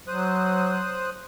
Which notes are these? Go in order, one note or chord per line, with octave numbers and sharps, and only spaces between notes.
F#3 C5 D#6 F#6